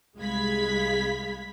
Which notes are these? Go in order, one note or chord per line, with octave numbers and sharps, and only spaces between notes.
C2 G#3 F5 B5 G#6 B6